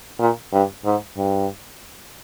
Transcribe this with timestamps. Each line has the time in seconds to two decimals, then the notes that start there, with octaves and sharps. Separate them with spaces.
0.20 A#2
0.53 G2
0.85 G#2
1.17 G2